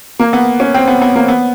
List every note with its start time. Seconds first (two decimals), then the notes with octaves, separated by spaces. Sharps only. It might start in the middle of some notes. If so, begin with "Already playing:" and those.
0.19 A#3
0.33 B3
0.60 C#4
0.74 C4
0.88 B3
1.01 B3
1.16 A#3
1.28 B3